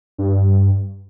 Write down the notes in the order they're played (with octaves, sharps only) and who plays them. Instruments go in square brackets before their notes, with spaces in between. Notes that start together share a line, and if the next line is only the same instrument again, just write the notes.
[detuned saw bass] G2